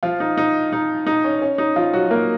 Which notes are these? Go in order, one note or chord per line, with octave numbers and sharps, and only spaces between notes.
F3 F4
D#4
D#4
D#4
D#4
C#4
C#4
D#4
F3 F4
F#3 F#4
A#3 A#4